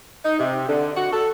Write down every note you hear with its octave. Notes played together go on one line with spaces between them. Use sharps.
D#4
C3
D3
F#4
A4